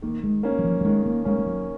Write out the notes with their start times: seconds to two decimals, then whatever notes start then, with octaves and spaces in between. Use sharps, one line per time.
0.02 D#3 A#3
0.24 G#3
0.43 A#3 C#4
0.59 F#3
0.64 F3
0.81 F#3
0.85 D#3 G#3
1.06 A#3
1.25 G#3 A#3 C#4
1.39 G#3
1.46 F#3